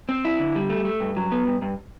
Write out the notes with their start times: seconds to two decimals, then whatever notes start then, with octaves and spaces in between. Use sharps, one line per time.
0.09 C4
0.25 E4
0.39 D3
0.56 G3
0.70 A3
0.85 A3
1.00 G2
1.17 F#3
1.32 B3
1.47 G2
1.62 G2